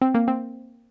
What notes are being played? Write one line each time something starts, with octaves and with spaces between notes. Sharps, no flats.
C4
A#3
C4